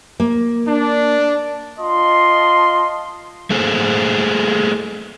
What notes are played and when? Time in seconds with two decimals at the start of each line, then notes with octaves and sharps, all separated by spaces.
0.20 A#3
0.67 D4
1.79 F4 D#5 A5 C6
3.50 A3 A#3 G#4 A4 C5